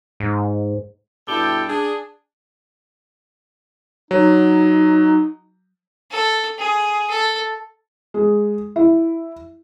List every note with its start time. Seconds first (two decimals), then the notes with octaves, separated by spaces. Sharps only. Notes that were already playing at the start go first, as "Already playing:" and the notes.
0.20 G#2
1.28 G2 B2 E4 G4 A4 G5
1.69 D4 G#4
4.11 F#3 D#4
6.11 A4
6.58 G#4
7.10 A4
8.14 G#3
8.76 E4